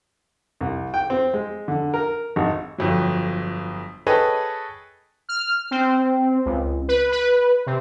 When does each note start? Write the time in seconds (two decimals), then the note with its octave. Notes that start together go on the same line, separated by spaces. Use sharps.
0.61 C2
0.94 G5
1.10 C4
1.34 G#3
1.68 D3
1.94 A#4
2.36 G#1
2.78 G1 F2 F#3
4.07 G#4 A4 B4 C#5 D#5 G5
5.29 F6
5.71 C4
6.46 C#2
6.88 B4
7.12 B4
7.66 C3